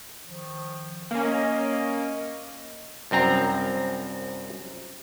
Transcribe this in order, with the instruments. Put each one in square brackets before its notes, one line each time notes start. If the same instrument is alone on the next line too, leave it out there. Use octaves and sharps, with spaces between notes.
[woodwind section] D#3 F3
[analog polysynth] A#3 C#4
[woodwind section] D#5
[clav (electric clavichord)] C2 F#2 C4 A#5